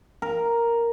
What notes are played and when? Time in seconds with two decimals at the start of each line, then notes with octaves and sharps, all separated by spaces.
0.22 A#4